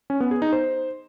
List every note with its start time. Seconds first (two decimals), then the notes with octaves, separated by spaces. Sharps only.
0.10 C#4
0.20 B3
0.31 G#4
0.42 D#4
0.52 C5